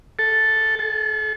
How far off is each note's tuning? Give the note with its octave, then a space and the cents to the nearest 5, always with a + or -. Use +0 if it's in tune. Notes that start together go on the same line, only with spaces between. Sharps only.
A4 +0
A4 -40